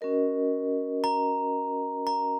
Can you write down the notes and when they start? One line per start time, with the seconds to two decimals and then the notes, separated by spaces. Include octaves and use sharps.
0.01 C#4 F#4 A#4 D#5
1.04 A#5
2.07 A#5